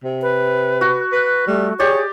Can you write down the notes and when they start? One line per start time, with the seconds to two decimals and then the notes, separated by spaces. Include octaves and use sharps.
0.04 C3
0.22 B4
0.81 F#4
1.12 B4
1.47 G3 A3
1.80 G4 G#4 C#5 D5